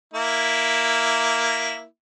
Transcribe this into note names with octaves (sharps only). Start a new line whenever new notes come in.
A#3 E4